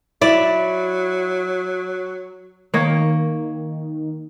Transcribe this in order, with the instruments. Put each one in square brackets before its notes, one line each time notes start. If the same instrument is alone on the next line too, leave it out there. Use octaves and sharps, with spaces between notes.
[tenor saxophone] F#3 [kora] E4 D5 E5
[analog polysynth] D#3 [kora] A#3 C#5